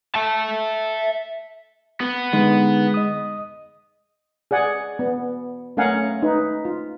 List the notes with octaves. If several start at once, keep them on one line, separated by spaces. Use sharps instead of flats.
E5 A5
B3
D3 G#3 D#4 B4
D#5 D#6
G#4 D5 F#5 G#5
B3
A3 C#4 A#4 F5 F#5 G#5
D#4 B4
F4